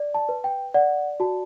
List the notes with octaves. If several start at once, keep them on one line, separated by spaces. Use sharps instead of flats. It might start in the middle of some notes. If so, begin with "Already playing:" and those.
Already playing: D5
A5
B4
G5
D5 F#5
F#4 A5